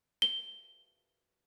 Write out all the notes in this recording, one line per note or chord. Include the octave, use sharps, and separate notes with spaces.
G7